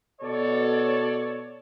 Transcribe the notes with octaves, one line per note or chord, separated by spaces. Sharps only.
B2 A4 C#5 D5